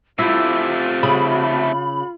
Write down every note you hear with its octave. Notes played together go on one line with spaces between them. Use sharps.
C3 A3 E4 F4
C#3 B5